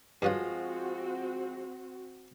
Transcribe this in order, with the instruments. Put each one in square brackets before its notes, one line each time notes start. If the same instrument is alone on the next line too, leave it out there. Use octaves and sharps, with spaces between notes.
[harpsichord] G2 C#4 F#5 [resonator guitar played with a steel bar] F3 G#3 F4 [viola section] C4 F#4